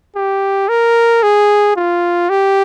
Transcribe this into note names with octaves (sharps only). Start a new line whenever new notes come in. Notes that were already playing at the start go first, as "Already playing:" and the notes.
G4
A#4
G#4
F4
G4